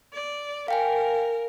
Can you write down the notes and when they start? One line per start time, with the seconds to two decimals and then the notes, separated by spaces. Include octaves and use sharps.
0.13 D5
0.68 A#4 F5 G5 G#5